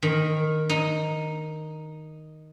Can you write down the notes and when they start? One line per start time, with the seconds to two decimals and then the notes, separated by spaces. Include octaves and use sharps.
0.02 D#3
0.69 D#4